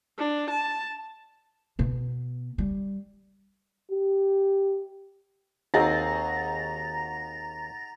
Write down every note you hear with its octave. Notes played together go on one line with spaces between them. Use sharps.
D4
A5
B2 B3
G3
G4
D#2 C4 D#4 F#4 G#4 A#5 A6 A#6